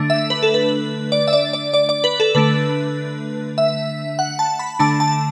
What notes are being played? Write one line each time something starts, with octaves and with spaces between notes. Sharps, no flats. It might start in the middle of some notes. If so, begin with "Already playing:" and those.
Already playing: D3 A3 D4
E5
B4
A4
B4
D5
E5
D5
D5
D5
D5
B4
A4
D3 A3 D4 B4
E5
F#5
A5
B5
D3 A3 D4 A5
A5